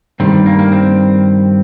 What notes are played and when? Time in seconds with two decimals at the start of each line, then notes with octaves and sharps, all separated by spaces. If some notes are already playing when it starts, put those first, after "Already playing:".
0.20 G2 D#3 G3 C4
0.46 A#3
0.59 A#3
0.72 C4